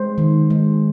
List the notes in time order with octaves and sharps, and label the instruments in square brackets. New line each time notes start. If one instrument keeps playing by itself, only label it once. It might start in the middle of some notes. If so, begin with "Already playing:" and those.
Already playing: [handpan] G#3 C5
D#3
G#3